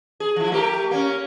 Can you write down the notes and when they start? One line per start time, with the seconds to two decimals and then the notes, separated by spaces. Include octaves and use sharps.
0.20 G#4
0.36 F3 E4
0.52 A3 G4 A#4
0.91 A#3 C#4